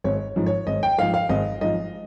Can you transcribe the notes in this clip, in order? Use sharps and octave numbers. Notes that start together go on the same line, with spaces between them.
G#1 C#5
G#2 F3
C#5
G#1 D#5
G5
G#2 F3 F5
F5
G#1 D#5
G#2 F3 D#5